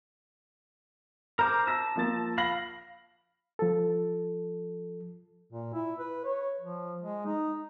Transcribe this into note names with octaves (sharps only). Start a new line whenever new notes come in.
A#4 C5 A#5 D6
A5 A#5 E6 A#6
F3 A#3 A6
F5 B5 A#6 F#7
F3 A4
A#2
E4
B4
C#5
F3
G#3
D#4